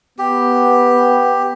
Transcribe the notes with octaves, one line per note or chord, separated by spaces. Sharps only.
B3 G4